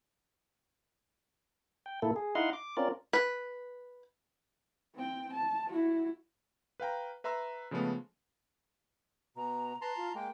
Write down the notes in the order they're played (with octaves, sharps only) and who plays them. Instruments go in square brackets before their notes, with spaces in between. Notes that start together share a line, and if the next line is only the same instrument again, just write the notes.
[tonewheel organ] G5
A#2 A#3 E4 A4
G#4
D#4 E4 D#5 F5 F#5 C6
D6
C4 C#4 F4 A#4 D5
[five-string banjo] B4
[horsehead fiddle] C4 G5
A5
E4 F#4
[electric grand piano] B4 F5 G5 A#5
B4 E5 A#5 C6 E6
C#3 F3 G#3 A3 B3
[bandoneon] B2 [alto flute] A#5
[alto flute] B4 [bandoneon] A5 A#5 C6
[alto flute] F4
[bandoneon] G#3 A#3 [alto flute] G5